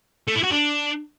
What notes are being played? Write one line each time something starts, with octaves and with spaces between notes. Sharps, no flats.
A3
E4
F#4
D4